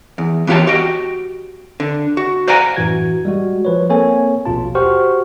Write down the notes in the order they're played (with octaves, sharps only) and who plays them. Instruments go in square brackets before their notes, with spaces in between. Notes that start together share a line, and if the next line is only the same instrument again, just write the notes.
[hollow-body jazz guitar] E2
E3 B3 F4 G4 C#5 A5
F#4 G4 D#5 G5
D3
F#4
C5 D5 F5 F#5 G#5 A#5
[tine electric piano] F#2 A2 E3 F#4 G#6
G3 G#3 F#4
F3 B4 C#5
A#3 C4 A4 C#5 G#5
A#1 D#2 B2 F4 A5
F#4 G4 C5 F#5 C#6 F6